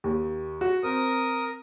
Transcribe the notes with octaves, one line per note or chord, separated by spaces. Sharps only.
D#2
F#4
C4 A#4 D#6